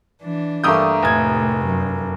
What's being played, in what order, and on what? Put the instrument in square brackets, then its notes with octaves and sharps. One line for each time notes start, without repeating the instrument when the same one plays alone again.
[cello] E3 D4
[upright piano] G2 D#6 G6 [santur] A3 A#3 G5
[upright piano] F1 G#6 [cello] A2 C3
[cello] F#2